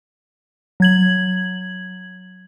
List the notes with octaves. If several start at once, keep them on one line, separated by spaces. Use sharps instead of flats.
F#3 G#6 F#7